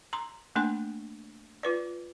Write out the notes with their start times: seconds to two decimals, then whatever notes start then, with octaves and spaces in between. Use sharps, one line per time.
0.13 A#5 C6
0.56 A3 A#3 D4 G#5 C6
1.63 F4 B4 D5